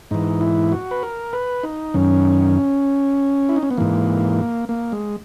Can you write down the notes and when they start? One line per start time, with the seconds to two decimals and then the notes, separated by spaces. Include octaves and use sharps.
0.11 G#2 E3 D#4
0.41 E4
0.72 F#4
0.91 B4
1.03 A#4
1.33 B4
1.63 D#4
1.94 F#2 D#3 C#4
3.49 E4
3.56 D#4
3.63 C#4
3.71 B3
3.77 G#2 E3 A#3
4.69 A#3
4.92 G#3